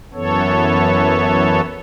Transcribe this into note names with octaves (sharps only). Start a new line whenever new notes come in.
F#2 E3 B3 A4 C#5